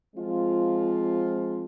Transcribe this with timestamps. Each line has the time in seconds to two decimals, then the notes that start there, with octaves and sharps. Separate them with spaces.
0.16 F3 G#3 C4 F4